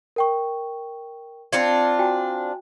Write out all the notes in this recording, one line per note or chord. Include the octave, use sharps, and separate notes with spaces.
A#4 G5 C#6
C4 D4 F4 G#6 C#7
F#4 G5 G#5